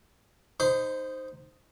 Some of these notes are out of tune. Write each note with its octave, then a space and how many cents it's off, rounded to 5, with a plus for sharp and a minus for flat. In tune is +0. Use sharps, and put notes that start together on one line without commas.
D#4 +0 C5 +0 C6 -45